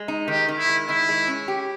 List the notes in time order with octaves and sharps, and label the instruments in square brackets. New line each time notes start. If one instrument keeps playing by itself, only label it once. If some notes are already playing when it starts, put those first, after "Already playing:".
Already playing: [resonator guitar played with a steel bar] G#3
D#4
[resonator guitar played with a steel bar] D#3 [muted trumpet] G4
[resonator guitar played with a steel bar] D#3
[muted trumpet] E4
[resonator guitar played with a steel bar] G#3
[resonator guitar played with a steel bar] D#3 [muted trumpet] E4
[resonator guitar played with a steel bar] G#3
C#4
G4